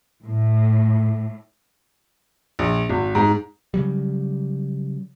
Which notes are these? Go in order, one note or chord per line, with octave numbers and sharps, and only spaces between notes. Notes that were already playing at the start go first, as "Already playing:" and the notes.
A2
A#1
G#1
G#2
C#3 F#3 G3